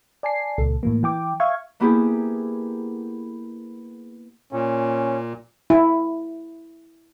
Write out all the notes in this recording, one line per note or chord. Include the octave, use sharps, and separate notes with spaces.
D5 G#5 A5 C7
C#2 A#2 A4
A2 E3 A#3
E3 G5 D6
E5 F5 C#6 G#6
A#3 B3 E4 G4 G#4
A#2 C#4
E4